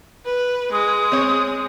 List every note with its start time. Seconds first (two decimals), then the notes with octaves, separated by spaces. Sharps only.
0.26 B4
0.72 G#3 D#6
1.12 C4 C#5